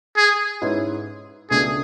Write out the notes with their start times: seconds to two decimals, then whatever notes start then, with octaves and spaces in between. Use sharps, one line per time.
0.17 G#4
0.62 G#2 G#3 C#4 E4 B4
1.51 C#2 B2 A3 D4 G#4